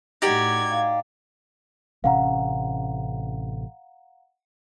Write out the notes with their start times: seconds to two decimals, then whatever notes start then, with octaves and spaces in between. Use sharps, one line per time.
0.22 A2 D#4 F#4 G4 D5 G#6
0.71 F5
2.04 A1 C3 C#4 F5 F#5 A#5